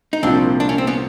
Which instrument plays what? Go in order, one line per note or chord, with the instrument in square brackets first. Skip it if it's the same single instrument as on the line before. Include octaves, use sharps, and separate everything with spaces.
[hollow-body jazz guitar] D#4
[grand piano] C2 A#2 F3 [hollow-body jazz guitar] C4 D4
[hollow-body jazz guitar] D4
C#4
C4
B3 C#4